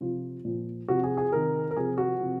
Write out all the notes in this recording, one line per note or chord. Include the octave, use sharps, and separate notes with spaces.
C3 F3 F4
A#2 F3
C3 F3 F#4
G#4
G#4
C3 D#3 A#4
A#4
C3 F3 G#4
F#4
C3 F3